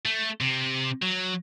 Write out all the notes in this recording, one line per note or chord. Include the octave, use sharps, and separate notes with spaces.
A3
C3
F#3